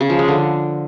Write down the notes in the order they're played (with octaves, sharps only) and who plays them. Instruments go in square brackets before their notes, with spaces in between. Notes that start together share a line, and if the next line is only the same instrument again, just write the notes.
[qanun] C#3
F3
G#3
D3